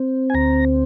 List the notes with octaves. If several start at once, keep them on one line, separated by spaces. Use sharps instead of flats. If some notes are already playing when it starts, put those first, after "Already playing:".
Already playing: C4
G#5
D2 A#5